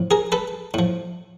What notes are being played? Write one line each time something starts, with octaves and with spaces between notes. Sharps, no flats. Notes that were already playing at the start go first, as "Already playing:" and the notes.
Already playing: A2 F3
G#4 A#4
A4 B4
A2 F3